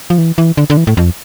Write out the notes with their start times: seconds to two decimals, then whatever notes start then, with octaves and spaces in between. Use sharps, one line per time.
0.10 F3
0.18 E3
0.38 E3
0.57 D3
0.70 D3
0.77 E3
0.87 A2
0.97 F2